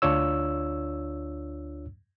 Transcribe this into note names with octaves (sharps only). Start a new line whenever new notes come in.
D2 D4 F4 C#5 E6